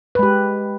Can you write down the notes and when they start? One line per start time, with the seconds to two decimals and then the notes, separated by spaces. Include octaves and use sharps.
0.15 B4
0.19 G#3
0.23 G4